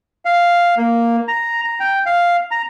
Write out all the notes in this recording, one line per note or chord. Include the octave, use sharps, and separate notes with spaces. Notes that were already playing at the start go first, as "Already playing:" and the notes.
F5
A#3
A#5
A#5
G5
F5
A#5